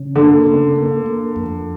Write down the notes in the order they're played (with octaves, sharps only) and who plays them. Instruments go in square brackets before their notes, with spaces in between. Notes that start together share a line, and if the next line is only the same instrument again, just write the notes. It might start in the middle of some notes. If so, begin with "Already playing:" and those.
Already playing: [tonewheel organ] C#3
[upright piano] D3 [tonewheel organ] A#3
[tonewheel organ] C#3
A#3
A#3
F2